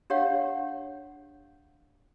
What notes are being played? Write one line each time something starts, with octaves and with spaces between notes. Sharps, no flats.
D4 G4 C#5 F5 F#5